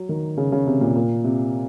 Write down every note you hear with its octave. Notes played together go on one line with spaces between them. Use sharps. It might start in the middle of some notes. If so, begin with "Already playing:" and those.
Already playing: F#3
D#3
C#3
C#3
C3
A#2
A#2
C3